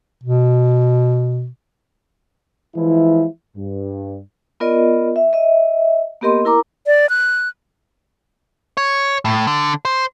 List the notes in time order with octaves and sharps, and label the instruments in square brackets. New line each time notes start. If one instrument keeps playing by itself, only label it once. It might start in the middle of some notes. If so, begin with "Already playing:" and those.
[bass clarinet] B2
[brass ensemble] E3 F3 G#3 E4
G2
[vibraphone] B3 F4 A#4 D5 D#5
E5
D#5 E5
A#3 B3 G4 A#4 D#5 C6
E4 A#4 A#5 D6
[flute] D5
F#6
[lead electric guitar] C#5
A2
D3
C5